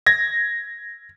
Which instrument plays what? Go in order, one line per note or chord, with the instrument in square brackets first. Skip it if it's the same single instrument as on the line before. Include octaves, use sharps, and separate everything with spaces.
[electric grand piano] G#6 A#6